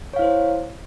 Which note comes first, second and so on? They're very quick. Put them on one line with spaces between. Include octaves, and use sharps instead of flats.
C#5 F5 E4 C5